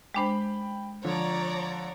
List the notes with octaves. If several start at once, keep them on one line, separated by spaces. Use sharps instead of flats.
G#3 D4 C5 G5 B5
D3 F3 C#5 D5 A#5